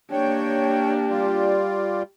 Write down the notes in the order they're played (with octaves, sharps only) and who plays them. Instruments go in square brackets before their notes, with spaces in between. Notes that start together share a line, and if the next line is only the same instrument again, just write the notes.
[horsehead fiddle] A#3 D4 [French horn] G4 [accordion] C#5 G5
[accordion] G3 F4 D5